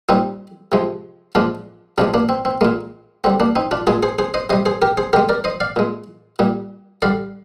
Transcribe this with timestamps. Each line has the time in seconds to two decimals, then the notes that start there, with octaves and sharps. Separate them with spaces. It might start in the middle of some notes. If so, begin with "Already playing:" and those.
0.09 A#2 G3 C4 D#4
0.72 C3 F3 G#3
1.35 A#2 F3 G#3 D4 F4
1.98 C3 F3 G#3 D4 F4
2.14 A#3 D4
2.29 C4
2.45 C4
2.61 A#2 G#3 A#3
3.24 D3 G3 C4
3.40 A#3 D4
3.56 C4 D#4
3.71 D4 F4
3.87 A#2 G#3 F4 G#4
4.03 G#4 C5
4.19 G#4 C5
4.34 C5 D#5
4.50 C3 C5 D#5
4.53 G3
4.66 G#4 C5
4.82 G4 A#4
4.97 G#4 C5
5.13 D3 G4 A#4
5.16 G#3
5.29 A#4 D5
5.44 C5 D#5
5.60 D5 F5
5.76 A#2 G#3
6.39 A#2 G3
7.02 D3 G3 D5 F5